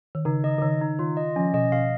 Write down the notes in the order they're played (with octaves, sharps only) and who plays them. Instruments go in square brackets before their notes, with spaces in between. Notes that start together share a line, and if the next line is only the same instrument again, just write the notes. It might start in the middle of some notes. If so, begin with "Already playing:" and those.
[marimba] D#3
[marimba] C#3 [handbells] D#4
[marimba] C#3 [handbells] D#5
[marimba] C#3
[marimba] D#3 [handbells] D#4
[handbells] D#4
[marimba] D#3 [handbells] F4
[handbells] D#5
[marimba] F3 [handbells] C#4
[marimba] B2 [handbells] D#5
[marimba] B2 [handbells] F5